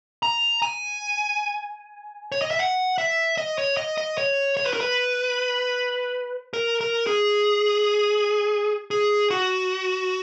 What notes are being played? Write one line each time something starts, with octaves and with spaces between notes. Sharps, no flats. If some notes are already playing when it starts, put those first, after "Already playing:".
A#5
G#5
C#5
D#5
E5
F#5
E5
D#5
C#5
D#5
D#5
C#5
C#5
B4
A#4
B4
A#4
A#4
G#4
G#4
F#4